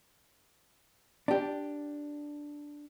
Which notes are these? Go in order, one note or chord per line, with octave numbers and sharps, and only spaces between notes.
D4 G4